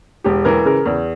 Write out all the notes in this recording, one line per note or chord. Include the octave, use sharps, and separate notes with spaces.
E1 G4
E3 A#4
C#3 A#4
E2